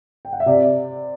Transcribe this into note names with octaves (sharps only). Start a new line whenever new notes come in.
G5
F#5
E5
C3 D5